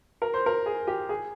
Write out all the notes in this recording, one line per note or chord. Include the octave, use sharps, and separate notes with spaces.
A#4
C5
A#4
G#4
G4
G#4